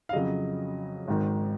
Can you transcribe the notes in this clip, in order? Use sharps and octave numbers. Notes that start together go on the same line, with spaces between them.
F5
F2 C#3 F#3 D#5
G#1 G#2 D#3